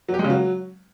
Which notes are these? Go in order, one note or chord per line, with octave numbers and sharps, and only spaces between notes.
F#3
G4
G#3
C#3
F#3